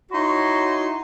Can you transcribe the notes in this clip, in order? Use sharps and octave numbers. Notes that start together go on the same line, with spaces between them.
D#4 E4 F#4 C#5 C6